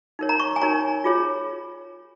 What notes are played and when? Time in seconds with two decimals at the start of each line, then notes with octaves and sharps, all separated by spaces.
0.19 D#4 A#4 C#5
0.29 A#5
0.40 C#6
0.56 G#5
0.61 D#4 A#4 C#5 A#5
1.04 F4 G#4 C#5